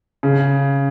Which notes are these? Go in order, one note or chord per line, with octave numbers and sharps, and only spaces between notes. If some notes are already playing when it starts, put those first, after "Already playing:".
C#3